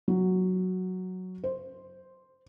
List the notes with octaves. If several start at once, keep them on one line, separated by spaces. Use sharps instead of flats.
F#3
C5